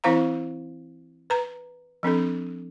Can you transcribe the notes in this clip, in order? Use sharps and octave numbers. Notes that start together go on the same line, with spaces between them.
E3 C4 E4 C5 F5 A#5
B4 A#5
F3 C4 D4 A4